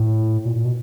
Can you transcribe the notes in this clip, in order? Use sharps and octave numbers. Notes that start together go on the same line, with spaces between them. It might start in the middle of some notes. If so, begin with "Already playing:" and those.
Already playing: A2
A#2
A#2
B2